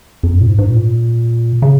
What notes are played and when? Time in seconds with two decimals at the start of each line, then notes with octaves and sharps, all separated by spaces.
0.23 F2
0.34 F#2
0.41 A#2
0.47 G#2
0.58 G#2
0.70 A#2
1.62 C#3